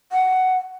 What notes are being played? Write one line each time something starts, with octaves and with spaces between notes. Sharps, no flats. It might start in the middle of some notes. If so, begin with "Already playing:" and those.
F#5